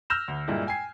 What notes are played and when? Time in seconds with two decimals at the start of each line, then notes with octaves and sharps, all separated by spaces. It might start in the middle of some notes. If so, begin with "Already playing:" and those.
0.10 E6 F6 G6 A#6 E7 F7
0.28 D2
0.48 G2 A#2 G#3 A#3 E4
0.67 G5 G#5 G#6 C7